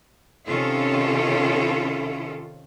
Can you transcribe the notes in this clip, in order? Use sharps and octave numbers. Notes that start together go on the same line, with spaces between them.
C3 D#3 C#4 F4 A4